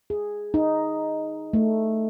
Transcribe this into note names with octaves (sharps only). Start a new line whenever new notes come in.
G#4
D#4
A3